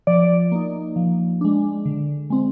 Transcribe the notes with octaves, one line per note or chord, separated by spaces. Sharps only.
F3 D5
A#3 D#4
F3
G#3 D4
D3
G#3 C4